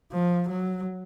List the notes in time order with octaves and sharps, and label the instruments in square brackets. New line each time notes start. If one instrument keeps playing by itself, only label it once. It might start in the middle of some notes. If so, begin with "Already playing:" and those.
[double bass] F3
F#3